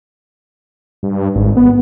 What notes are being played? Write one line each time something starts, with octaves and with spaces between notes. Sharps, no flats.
G2
G#1
B3